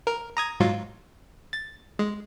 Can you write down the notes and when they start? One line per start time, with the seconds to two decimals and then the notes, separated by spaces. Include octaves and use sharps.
0.07 A#4
0.37 A#5 D#6 G#6
0.60 G#2 F#3 F4
1.53 A6
1.99 G#3